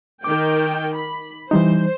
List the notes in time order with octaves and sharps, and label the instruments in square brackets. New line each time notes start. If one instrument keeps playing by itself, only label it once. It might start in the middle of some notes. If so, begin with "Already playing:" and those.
[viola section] D#3 G5 [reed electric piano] D6
[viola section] B5
[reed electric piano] E3 G3 D#4 [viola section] C5